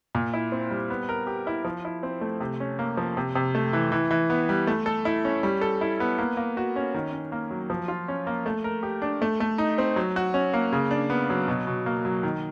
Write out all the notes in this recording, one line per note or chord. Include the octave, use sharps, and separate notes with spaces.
A#2
E4
C4
G3
B3
A#4
G4
E4
F3
E4
C4
A3
C3
C#4
A#3
F3
C3
C3
A3
E3
E3
E3
B3
G3
A3
A4
E4
C#4
G3
A4
E4
B3
A#3
A#3
F#4
C#4
D#3
C#4
A#3
F#3
F3
F4
C#4
A#3
A3
A#4
G4
D4
A3
A3
D#4
C4
F#3
F#4
C#4
A#3
C#3
D4
B3
F#3
B2
B2
A#3
F#3
D#3